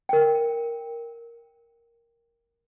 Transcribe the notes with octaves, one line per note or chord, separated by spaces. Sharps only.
A#4 G5